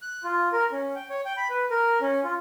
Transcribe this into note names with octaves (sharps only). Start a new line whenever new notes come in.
F#6
F4
A#4
C#4
G5
C#5
G5
B5
B4
A#4
C#4
F4